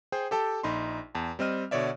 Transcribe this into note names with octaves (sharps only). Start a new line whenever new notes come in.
G#4 C5 G5
G4 A4 G5 A5
A#1 D#4 B5 C6
E2 A5
G3 C4 D#5 F6 D#7
B2 D3 C#5 D5 E5